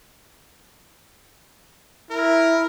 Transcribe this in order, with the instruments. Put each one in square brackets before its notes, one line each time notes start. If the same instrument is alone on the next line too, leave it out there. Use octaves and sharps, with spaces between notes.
[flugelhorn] E4 [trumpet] A#4